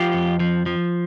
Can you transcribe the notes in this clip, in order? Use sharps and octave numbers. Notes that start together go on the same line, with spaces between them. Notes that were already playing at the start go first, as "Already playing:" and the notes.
Already playing: F3 F4 G4
F2
F3
F3